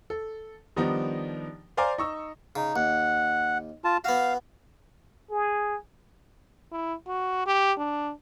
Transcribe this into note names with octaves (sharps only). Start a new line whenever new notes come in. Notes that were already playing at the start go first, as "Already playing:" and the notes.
A4
D#3 F3 G3 B3 D4 D#4
C5 D5 F5 G#5 A#5 D6
D#4 C#6 E6
C#3 D#4
D#2 F#5
F4 A5
B3 F#4 F5
G#4
E4
F#4
G4
D4